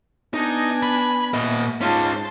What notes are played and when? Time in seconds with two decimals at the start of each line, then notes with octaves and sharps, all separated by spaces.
0.34 B3 D4 D#4 G#5
0.83 B5
1.34 A#2 D#5
1.81 G#2 C#4 F4 A5 C6